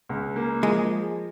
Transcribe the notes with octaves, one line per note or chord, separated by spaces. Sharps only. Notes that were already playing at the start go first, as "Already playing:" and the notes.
C#2
A#3
F3 G#3